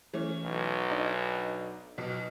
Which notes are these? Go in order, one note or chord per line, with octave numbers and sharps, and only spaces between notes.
E3 A3 C#4
B1
D4 D#4
B1 B2